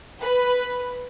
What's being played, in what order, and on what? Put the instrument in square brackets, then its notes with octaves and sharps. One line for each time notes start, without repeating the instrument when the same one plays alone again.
[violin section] B4